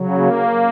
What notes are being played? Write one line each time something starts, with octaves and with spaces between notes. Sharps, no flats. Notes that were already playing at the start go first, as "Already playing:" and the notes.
Already playing: C#3 F#3
A#3